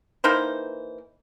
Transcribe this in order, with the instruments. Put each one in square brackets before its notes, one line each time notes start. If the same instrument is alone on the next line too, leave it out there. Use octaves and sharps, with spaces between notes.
[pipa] E3 A#3 D#4 C5